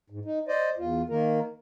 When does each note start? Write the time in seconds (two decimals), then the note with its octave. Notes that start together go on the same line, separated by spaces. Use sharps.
0.10 G#2
0.25 D#4
0.48 C5 D5 D#5
0.78 E2 F4
1.10 D#3 A#3 A#4